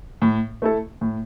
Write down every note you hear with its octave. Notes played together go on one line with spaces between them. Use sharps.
A2
A3 E4 A4
A2